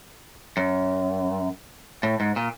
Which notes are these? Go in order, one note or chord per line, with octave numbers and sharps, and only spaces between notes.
F#2
A2
G#2
A#2